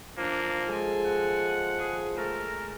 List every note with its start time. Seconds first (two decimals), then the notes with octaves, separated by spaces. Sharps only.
0.17 F3 A#3 D4
0.68 G#3 A4 G#5
1.05 F#5
1.78 G#4
2.17 A3 A4 A#4